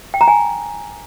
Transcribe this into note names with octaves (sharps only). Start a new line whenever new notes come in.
G5
A#5
G#5